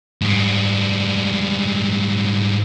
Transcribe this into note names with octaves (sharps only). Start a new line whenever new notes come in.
G#2 G3